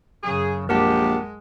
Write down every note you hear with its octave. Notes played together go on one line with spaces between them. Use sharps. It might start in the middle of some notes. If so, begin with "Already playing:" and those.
F#2 C#3 G#4
A#1 G#3 G4 A#4 F#5 A5